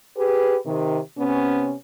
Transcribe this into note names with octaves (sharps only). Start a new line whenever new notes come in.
G4 G#4 B4
C3 D#3
C3 B3 C#4